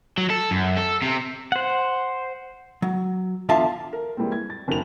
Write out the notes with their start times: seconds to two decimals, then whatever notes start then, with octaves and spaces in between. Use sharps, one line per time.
0.18 F#3
0.30 A4
0.51 F#2
0.77 A4
1.02 C3
1.52 C5 F#5
2.82 F#3
3.49 E2 D3 F4 E5 F5 A5
3.93 A#4
4.17 E3 G3 G#3 A#3 C4
4.32 G#6
4.50 A6
4.68 F#1 D#3 F#4 A#4 F7